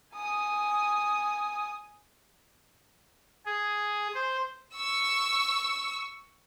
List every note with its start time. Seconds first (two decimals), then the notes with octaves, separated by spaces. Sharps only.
0.14 G#5 D#6
3.46 G#4
4.15 C5
4.75 C#6 E6